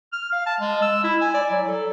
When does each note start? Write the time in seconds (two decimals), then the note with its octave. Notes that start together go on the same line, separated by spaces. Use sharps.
0.13 F6
0.32 F5
0.46 A5
0.60 G#3
0.82 E6
1.04 E4
1.21 G#5
1.34 D5
1.51 F#3
1.68 A4